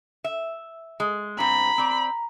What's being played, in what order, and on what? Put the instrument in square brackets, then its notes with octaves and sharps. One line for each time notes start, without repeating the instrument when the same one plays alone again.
[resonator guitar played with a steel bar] E5
G#3
[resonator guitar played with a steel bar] G2 C4 [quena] A#5 [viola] B5
[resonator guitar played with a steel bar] C4 D5